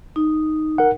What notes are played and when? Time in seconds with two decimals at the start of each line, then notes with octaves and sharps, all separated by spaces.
0.16 D#4
0.78 A#4 F#5